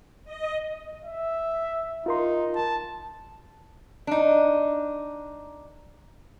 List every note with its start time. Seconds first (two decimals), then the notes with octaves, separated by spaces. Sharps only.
0.25 D#5
1.05 E5
2.06 D#4 F4 A#4 C6
2.55 A5
4.07 D4 D#4